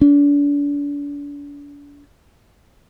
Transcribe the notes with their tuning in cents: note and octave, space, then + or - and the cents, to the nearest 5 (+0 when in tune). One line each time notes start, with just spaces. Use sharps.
D4 -40